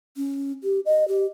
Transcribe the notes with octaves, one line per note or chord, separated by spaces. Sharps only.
C#4
G4
D#5
G4